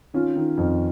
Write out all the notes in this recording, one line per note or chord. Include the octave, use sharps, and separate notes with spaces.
D#3 C#4 F4
D#3
F2